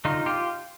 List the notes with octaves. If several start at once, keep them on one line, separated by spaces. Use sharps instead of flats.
D3 D#4 F4
F4 G4